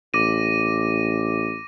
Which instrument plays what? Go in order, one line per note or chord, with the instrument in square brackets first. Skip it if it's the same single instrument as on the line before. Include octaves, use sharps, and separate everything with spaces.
[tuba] A1 [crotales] D6 A#6 D#7